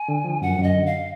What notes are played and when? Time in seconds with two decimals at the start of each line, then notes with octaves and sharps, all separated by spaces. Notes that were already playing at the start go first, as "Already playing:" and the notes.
Already playing: G#5
0.08 D3
0.25 F3
0.42 F#2 F#5
0.59 F#2 D#5
0.75 D3
0.86 F5